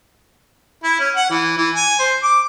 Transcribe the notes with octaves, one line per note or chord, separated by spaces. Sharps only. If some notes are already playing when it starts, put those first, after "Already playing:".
E4
C#4
F#5
E3
E3
G#5
C5
D6